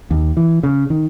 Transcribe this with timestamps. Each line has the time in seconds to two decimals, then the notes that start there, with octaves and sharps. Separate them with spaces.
0.11 D#2
0.37 E3
0.63 C#3
0.90 D#3